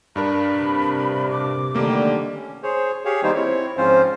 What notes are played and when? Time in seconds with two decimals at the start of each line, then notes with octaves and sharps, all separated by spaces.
0.16 G2 D4 A#4 B5
0.54 C3
1.31 D6
1.75 D3 D#3 G3 A3 A#3
2.35 C#4
2.63 G#4 C5 C#5
3.05 G4 G#4 C#5 F5
3.23 D#3 G3 A#3 B3 D#4 C5
3.35 C4 E4 C#5
3.77 G#2 F3 C4 C#4 F4 C5